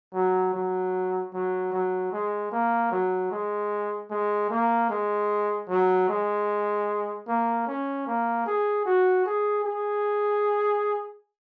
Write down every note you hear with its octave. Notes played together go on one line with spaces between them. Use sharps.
F#3
F#3
F#3
F#3
G#3
A#3
F#3
G#3
G#3
A#3
G#3
F#3
G#3
A#3
C#4
A#3
G#4
F#4
G#4
G#4